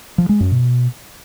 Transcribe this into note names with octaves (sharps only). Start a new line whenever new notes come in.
F3
G#3
F#2
B2